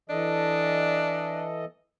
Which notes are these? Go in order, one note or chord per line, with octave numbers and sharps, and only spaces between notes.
E3 D4 A4 D#5